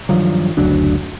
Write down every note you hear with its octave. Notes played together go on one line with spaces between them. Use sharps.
G2 D#3 F3 F#3
F#1 D2 F#3 D4